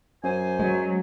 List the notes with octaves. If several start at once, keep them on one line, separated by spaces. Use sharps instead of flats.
F#2 C5 G#5
F#3 G#3